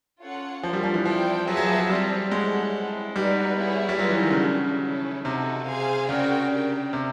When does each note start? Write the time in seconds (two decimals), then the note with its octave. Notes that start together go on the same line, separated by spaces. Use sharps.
0.21 C#4 F4 A4 C#5 F#5
0.63 F3 D4 F4 A#4 C#5
0.73 G3
0.84 F3
0.94 E3
1.05 F3 C4 E4 A4 D5 G5
1.47 F#3 G#4 B4 E5 A5
1.57 F#3
1.68 F3
1.79 F#3
1.89 G3 C4 F4 A4 D5
2.31 G#3 E4 A4 C#5 F#5
2.73 C4 E4 A4
3.15 G3 D#4 F#4 B4 D5
3.57 B3 E4 G#4 C#5
3.89 G3
3.99 F#3 F4 G#4 B4
4.09 E3
4.20 D#3
4.31 C#3
4.41 D4 F#4 A4
4.83 C#4 E4 A4
5.25 C3 D#4 F#4 A4
5.67 G#4 C5 F5 G#5
6.09 C#3 C#4 F#4 A#4 D5 G5
6.51 D4 G4 A#4 D5 G5
6.93 C3